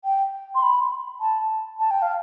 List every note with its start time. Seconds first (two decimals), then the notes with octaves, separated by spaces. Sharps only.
0.05 G5
0.55 C6
0.62 B5
1.21 A5
1.80 A5
1.91 G5
2.02 F5